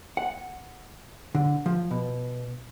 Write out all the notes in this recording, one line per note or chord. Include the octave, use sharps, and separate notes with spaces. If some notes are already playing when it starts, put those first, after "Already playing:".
F#5
D3
F3
B2